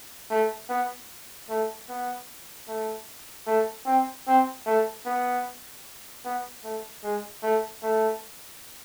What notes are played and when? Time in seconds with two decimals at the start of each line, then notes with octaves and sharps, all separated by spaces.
0.31 A3
0.70 B3
1.50 A3
1.89 B3
2.68 A3
3.47 A3
3.86 C4
4.27 C4
4.66 A3
5.06 B3
6.25 B3
6.64 A3
7.04 G#3
7.43 A3
7.83 A3